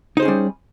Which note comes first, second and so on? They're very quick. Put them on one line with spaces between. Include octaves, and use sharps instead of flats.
D#4 C5 G#4 C#4 G3